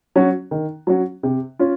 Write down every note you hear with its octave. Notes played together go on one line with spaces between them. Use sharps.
F#3 C#4 F#4
D#3
F#3 C#4 F#4
C3
C#4 F4